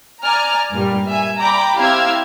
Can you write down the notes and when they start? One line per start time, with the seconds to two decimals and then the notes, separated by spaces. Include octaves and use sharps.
0.23 D5 G#5 A#5 F6
0.71 G2 A#2 G3
1.07 E5 G#5
1.40 D5 G5 A#5 B5 D6
1.78 C4 E4 G4 F5 E6 G#6